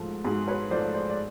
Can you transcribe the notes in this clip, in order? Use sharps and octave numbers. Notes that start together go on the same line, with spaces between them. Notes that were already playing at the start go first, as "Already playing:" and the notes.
Already playing: G#2 F3 A3
G#2 F#4 G#4
B4 C#5
F3 A3 C5 D5
C5 D5
D5